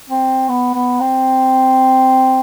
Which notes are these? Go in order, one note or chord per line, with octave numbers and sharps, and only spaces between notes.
C4
B3
B3
C4